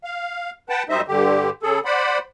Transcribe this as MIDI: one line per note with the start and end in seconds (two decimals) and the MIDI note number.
0.04 0.50 77
0.69 0.83 71
0.69 0.83 78
0.69 0.83 79
0.69 0.83 81
0.89 1.01 42
0.89 1.01 55
0.89 1.01 63
0.89 1.01 72
0.89 1.01 75
0.89 1.01 76
1.08 1.50 43
1.08 1.50 50
1.08 1.50 67
1.63 1.79 49
1.63 1.79 68
1.63 1.79 69
1.85 2.18 72
1.85 2.18 74
1.85 2.18 78
1.85 2.18 83